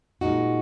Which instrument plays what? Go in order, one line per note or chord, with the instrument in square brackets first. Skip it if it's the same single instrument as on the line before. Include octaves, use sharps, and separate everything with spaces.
[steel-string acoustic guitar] A#2 G#3 D#4 F#4